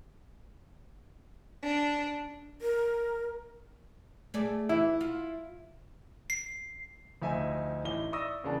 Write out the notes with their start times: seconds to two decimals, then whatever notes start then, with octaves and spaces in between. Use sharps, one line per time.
1.63 D4
2.62 A#4
4.34 A3 G#4 D5
4.69 E3 E4
5.01 F4
6.30 C7
7.22 D2 F3 D#4 E5 G#5
7.84 A1 D#4 E4 G7
8.12 D5 E5 C#6 D#6 E6 A#6
8.44 E2 C#3 A#3 D4 F#5 A5